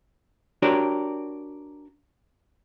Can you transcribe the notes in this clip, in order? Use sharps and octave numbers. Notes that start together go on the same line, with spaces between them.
D4 F#4 G4 A#4 C#5 D5